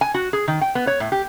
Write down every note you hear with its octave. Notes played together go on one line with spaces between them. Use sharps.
G#5
F#4
G#4
D#3
G5
B3
C#5
A2
G4